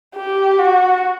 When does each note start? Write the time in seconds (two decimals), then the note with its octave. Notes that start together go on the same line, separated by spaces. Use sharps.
0.15 G4
0.59 F#4